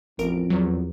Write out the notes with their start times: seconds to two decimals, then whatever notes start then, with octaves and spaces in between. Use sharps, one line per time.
0.19 A1 F2 A#4 D7
0.50 E2 F#3